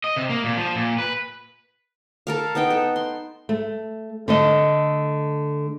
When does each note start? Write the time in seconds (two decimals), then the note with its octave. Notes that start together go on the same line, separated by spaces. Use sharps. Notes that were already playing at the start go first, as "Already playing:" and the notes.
0.04 D#5
0.16 C3
0.29 A#3
0.44 A#2
0.57 F3
0.75 A#2
0.99 B4
2.27 A4 A#4 F5
2.55 B3 D#4 F#5 G5
2.70 A4
2.96 C6
3.49 A3
4.28 D3 A3 D#5